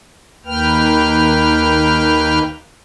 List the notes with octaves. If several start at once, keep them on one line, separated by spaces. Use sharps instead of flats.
D#2 A#3 B4 G5 F6